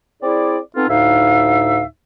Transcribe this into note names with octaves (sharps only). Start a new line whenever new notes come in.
C4 E4 G#4 D5
B3 C4 D#4 F4 A4
D2 A2 D#4 E5 F5